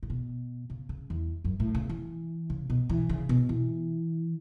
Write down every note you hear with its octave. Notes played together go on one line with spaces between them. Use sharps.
A2
B2
C#3
C#3
E2
F#2
A2
C#3
E3
C#3
B2
E3
C#3
B2
E3